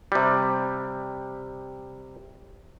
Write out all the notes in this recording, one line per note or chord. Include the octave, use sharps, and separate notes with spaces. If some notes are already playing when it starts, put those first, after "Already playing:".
C3 G3